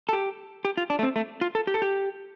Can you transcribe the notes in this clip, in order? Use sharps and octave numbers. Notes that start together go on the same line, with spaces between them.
A4
G4
G4
F4
D4
A3
C4
A3
F4
A4
G4
A4
G4